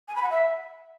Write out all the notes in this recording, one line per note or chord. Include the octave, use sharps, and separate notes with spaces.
G#5
B5
F#5
E5